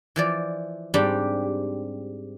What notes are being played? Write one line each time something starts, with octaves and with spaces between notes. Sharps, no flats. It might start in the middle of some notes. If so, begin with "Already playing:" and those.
E3 F3 D5
G#2 G3 C4 D4 G4